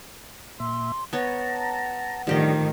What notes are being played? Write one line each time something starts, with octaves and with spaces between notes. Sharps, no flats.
A#2 E5 C6
B3 C#5 F#5 A5 A#5
A2 D#3 F3 G3 D4 G4 D#5